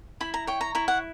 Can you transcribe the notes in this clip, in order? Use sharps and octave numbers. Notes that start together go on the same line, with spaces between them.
E4 B5
A#5
C#5 G5
A#5
E4 A#5
F#5